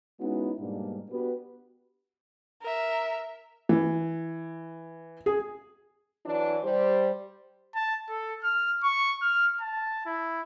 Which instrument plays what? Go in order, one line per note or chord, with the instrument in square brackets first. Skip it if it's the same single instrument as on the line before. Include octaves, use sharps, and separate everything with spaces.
[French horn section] G#3 B3 C#4 D#4 E4 F#4
G#2 B2 G3 A#3 D4
B3 D4 F#4 G4 B4
[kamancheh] A#4 E5
[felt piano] E3
G#4
[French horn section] E3 F#3 D4
G3 C5
[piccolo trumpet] A5
A4
F6
C#6
F6
A5
E4